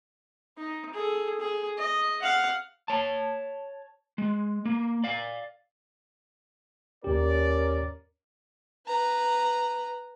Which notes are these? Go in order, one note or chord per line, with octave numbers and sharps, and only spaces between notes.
D#4
G#4 A4
G#4
D#5
F5 F#5
C#5 A5
G#3
A#3
D5 F5
D#2 C#4 G4 A#4 D5
B4 A#5